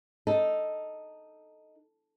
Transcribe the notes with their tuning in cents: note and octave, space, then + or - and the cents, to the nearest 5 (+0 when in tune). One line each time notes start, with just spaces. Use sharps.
D#4 +0 A4 +0